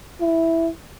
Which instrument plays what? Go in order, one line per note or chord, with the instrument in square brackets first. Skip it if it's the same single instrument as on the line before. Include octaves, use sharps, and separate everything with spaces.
[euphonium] E4